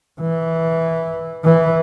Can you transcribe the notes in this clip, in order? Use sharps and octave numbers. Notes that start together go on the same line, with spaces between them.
E3
E3